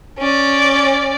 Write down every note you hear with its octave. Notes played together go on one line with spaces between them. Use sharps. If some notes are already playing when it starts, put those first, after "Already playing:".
C#4 D5